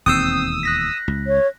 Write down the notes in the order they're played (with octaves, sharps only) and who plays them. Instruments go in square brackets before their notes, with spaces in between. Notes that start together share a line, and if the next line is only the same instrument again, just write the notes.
[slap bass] E1 D#2 [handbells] C4 G6 C7 [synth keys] D#6 E6
[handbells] F#6 A#6 B6
[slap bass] C#2
[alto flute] C#5